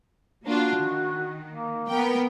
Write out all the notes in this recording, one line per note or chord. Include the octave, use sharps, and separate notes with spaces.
A#3 D4 F4 F#4
D#3
A#3
B3 A#4 G5